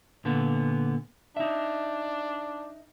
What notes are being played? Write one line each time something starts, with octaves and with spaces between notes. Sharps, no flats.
A#2 D3 B3
D4 D#4 E5